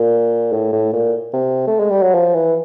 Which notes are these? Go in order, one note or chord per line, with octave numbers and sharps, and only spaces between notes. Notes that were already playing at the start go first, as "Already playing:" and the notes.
Already playing: A#2
A2
A2
A#2
C3
A3
G#3
G3
F#3
F3
E3